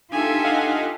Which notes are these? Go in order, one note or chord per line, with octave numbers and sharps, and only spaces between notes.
D4 D#4 F4 G4 A4 E5 G#5
D#5 F5 F#5